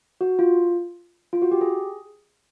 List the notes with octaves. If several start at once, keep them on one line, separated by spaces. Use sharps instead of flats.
F#4
F4
F4
F#4
G4
G#4